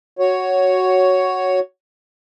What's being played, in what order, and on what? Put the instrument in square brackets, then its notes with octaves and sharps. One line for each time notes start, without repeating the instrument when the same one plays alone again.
[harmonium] F#4 C#5